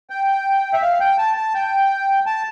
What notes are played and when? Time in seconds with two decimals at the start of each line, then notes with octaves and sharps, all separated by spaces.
0.10 G5
0.73 E5
0.82 F5
1.00 G5
1.18 A5
1.37 A5
1.55 G5
2.26 A5